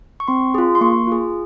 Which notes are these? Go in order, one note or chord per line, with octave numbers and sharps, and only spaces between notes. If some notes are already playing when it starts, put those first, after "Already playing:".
C#6
C4 C6
F4 G#4
C6
A#3 C#6
F4 G#4